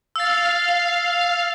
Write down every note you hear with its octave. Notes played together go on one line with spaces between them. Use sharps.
F5 E6 A6